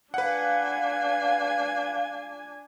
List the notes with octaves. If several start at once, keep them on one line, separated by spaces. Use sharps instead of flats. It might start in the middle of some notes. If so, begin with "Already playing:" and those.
D4 B4 F5 F#5 G#5